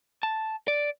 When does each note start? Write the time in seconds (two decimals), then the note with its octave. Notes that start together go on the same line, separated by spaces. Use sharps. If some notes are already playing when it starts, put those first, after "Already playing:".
0.23 A5
0.68 D5